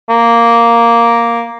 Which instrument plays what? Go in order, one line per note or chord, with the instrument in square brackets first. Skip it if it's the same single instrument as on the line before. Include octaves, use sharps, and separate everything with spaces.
[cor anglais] A#3